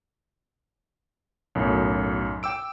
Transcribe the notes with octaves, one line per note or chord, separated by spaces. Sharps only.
B1 F#2 A2
G5 D6 E6 D7